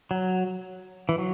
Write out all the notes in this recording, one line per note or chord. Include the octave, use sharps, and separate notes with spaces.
F#3
E3
F#3